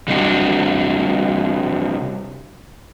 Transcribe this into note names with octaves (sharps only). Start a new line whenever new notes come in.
C3 G3 C4 D4 F#4